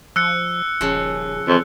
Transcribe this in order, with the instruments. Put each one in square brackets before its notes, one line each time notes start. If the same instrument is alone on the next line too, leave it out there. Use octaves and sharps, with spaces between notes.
[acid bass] F3 [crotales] E6 F#6 C#7
[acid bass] D#1 [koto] C#3 F3
[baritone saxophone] F2 [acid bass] E3